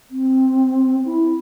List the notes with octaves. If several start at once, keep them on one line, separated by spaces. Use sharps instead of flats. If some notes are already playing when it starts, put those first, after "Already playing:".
C4
E4